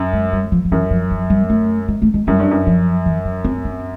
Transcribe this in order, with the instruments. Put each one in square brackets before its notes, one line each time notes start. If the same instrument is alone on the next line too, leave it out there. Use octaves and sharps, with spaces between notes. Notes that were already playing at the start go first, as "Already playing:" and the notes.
Already playing: [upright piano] F#2
[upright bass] G#3
G3
F3
F3
[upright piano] F#2 [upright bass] E3
[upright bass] F3
F3
G3
A3
G#3
A3
G#3
[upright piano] F#2 [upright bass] G3
[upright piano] G2
F#2
[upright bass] F3
E3
F#3
C4
C4